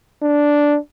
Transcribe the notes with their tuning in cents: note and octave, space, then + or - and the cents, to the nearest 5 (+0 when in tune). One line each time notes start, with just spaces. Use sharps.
D4 -5